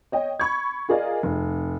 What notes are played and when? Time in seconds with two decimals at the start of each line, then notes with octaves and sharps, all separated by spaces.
0.12 C#5 D#5 G5
0.40 B5 C#6 G#6
0.89 F4 G#4 A#4 D5 D#5 F5
1.23 F1